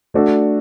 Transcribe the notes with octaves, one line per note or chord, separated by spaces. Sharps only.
A3 D4 F#4 A4